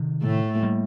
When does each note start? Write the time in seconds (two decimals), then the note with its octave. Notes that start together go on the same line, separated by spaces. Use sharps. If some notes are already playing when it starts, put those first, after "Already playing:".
Already playing: C3 D#3
0.23 A2 A3
0.63 G3 A#3